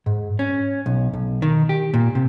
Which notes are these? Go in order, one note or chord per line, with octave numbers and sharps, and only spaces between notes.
G#2
C#4
B1
B1
D#3
G4
A#2
C3